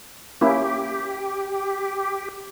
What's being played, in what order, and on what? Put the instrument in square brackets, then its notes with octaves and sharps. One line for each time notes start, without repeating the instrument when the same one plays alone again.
[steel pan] A#3 C#4 E4 [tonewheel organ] G4